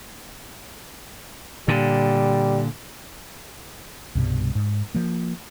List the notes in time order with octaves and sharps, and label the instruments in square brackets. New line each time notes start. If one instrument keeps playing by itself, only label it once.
[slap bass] A#2 D3 [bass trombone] G3
[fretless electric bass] C2 G2 B2 G3
G#2
F3 A#3